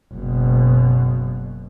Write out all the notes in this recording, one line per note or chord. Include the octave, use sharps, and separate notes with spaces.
F#1 B2